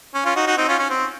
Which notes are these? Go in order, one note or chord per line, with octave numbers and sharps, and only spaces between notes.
C#4
C#4 F4
D#4 F#4
D#4 F#4
C4 D#4
C#4 F4
C#4
C4